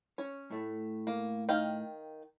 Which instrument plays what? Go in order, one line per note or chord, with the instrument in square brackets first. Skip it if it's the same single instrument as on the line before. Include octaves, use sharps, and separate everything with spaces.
[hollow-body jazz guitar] C#4 [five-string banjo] C#5
[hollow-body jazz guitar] A2 A3
[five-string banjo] A#3
D#3 F5 G5